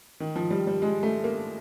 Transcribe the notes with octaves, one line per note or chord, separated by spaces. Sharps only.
D#3
F3
G3
G3
G#3
A3
A#3